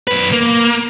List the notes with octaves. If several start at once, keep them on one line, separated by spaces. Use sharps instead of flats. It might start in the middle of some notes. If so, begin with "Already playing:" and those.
F#2 B4
A#3